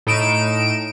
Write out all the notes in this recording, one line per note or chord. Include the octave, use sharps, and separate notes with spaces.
A2 D#4 D7 E7